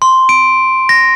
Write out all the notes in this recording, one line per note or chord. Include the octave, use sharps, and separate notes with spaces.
C6
D7
A#6